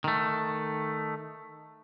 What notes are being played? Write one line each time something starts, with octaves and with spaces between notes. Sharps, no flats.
D#3 A3